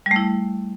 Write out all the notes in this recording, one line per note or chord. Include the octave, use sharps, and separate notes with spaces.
G3
A3
E4